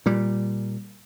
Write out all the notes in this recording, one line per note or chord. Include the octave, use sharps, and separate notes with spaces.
A#2 G3